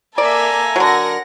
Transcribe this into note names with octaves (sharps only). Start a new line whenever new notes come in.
A#3 A4 D5 E5 G#5 A#5
D3 F#3 A#4 F#5 A#6